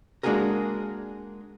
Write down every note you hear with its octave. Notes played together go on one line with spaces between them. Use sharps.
G#3 A#3 D4 F#4 G#4 A#4